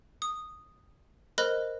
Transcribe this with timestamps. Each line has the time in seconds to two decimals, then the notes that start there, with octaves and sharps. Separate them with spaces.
0.22 D#6
1.38 A#4 C5 D#5 B5 F#6